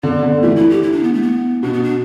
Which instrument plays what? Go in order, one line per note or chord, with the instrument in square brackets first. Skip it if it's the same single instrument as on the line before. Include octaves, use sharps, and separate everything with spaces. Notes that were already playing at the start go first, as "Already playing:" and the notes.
[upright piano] D3 [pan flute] B3
[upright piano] D3
[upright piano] E3 [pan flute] A3
[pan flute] E4
G4
E4
D4
B3
A3
B3
[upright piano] B2 [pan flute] D4
[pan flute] B3
D4